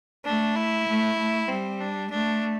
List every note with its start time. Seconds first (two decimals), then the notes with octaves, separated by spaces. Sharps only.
0.25 A3 D4
0.56 E4
0.87 A3
1.18 A3
1.49 G3 C4
1.80 D4
2.10 A3 D4